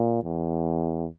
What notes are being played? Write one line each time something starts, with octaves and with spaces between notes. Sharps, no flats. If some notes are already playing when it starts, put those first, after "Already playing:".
Already playing: A#2
E2